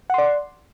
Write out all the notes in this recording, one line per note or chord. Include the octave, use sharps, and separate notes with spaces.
D5 F#5 C6